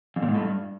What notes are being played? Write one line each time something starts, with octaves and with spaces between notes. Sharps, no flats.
F2
A#2
G#2
A2
G2